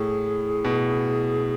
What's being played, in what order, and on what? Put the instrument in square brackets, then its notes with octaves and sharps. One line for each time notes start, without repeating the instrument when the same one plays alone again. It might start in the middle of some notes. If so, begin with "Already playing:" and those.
Already playing: [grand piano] A2 [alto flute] G#4
[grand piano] B2